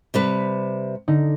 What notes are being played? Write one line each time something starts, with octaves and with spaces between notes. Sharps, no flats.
C3 G3 B4
D3 D#4